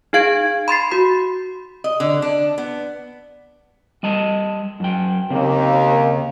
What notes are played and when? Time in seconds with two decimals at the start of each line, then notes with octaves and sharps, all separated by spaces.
0.13 D#4 G#4 F5 G#6 D7
0.68 B5 C6 A6 C7
0.92 F#4 B5
1.84 D#5
2.00 D3
2.22 D4
2.58 B3
4.03 G3 D#5 A5
4.80 F#2 G5
5.30 D#2 C#3 A#3 C4